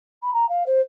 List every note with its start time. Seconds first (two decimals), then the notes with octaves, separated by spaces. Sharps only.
0.22 B5
0.33 A#5
0.49 F5
0.66 C5